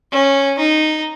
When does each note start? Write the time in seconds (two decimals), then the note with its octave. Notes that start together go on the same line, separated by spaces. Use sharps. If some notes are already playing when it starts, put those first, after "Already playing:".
0.12 C#4
0.59 D#4